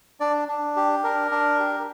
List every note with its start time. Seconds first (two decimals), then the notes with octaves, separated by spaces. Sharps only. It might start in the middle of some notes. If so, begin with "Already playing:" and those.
0.20 D4 D5
0.48 D4
0.77 G4
1.04 D4 A#4
1.31 D4
1.59 G4